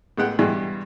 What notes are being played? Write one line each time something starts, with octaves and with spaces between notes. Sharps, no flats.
A1 G#3 B3 F#5 G5
G2 B2 E3 G3 G#3